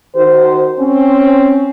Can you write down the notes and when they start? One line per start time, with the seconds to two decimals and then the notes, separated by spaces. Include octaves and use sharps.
0.15 D#3 F#4 C5
0.79 C4 C#4